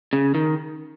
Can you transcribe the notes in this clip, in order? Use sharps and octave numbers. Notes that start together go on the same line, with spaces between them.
C#3
D#3